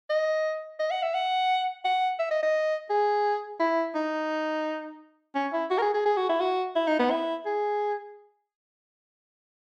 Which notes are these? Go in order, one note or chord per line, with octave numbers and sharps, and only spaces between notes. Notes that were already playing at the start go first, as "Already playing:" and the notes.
D#5
D#5
F#5
E5
F#5
F#5
E5
D#5
D#5
G#4
E4
D#4
C#4
E4
F#4
A#4
G#4
G#4
G#4
F#4
E4
F#4
E4
D#4
B3
E4
G#4